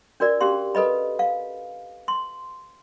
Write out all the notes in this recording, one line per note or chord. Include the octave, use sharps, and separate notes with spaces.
D4 F#4 A#4 D5
C#4 G4 F5 C6
A4 B4 D#5 B5
F5
C6